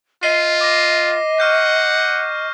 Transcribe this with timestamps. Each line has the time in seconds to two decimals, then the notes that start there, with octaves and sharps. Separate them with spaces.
0.23 F4 D#5 C7 D#7
0.61 D6 A#6
1.40 F#5 C#6 F6 G6